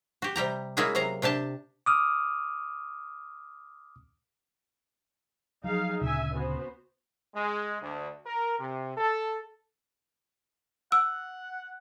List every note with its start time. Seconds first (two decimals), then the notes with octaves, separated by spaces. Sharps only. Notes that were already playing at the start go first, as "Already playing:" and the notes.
0.22 F#4 G4
0.36 C3 G3 G4 A#5
0.77 G#3 A#3 C#4 E4 F#4 G#4
0.95 C3 F#3 F5 A#5
1.22 C3 D4 G4 A5
1.86 D6 D#6 F6
5.64 F3 F#3 D#4 G#4 F5
6.01 D2 A#2 C#3 E5 G#5
6.34 B3 F#4 C5
7.34 G#3
7.82 D2
8.26 A#4
8.58 C3
8.97 A4
10.92 F#5 E6